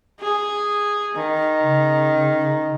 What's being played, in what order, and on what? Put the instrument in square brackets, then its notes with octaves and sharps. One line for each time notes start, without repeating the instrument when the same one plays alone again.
[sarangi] G#4
D#3
[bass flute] C#3